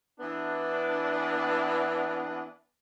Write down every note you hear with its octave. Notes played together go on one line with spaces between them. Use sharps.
E3 B3 D4